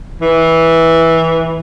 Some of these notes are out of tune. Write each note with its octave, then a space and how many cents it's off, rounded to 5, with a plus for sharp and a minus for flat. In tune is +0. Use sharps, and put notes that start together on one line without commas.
E3 -10